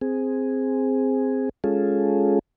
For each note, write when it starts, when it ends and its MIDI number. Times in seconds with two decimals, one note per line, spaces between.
0.01 1.49 60
0.01 1.49 68
1.64 2.39 56
1.64 2.39 61
1.64 2.39 65
1.64 2.39 68
1.64 2.39 69